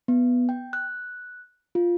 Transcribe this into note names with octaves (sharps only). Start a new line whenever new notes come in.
B3
G5
F#6
F4